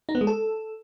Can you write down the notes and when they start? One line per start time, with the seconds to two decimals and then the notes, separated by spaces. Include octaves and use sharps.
0.09 D#4
0.15 B3
0.21 G#3
0.27 A4